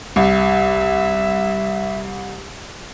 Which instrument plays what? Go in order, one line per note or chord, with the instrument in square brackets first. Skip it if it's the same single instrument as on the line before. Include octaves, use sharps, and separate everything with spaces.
[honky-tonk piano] C2 [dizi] E5